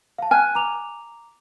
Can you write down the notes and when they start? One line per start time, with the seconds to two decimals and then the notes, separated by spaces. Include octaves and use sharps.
0.18 F5 A5
0.31 G#5 F6 F#6
0.55 A#5 D6 F7